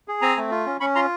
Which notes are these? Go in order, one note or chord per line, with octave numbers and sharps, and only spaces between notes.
G#4
C4 G#5 A#5
A3
F4
C#4
C#4 B5 C#6
F4 A#5 C6